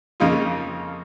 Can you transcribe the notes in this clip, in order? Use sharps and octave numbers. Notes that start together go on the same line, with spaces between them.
F2 C#3 A#3 D#4 F4